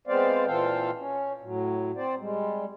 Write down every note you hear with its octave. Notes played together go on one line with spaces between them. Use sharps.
G#3 B3 C4 C5 D5 F5
A#2 E3 A4 C5 F5 G5
C#4
A2 F#3
C4 C5 D5
G3 G#3